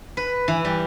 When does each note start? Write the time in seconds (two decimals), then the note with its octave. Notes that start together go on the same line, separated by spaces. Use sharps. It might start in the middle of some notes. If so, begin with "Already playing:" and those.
0.17 B4
0.48 E3
0.65 G3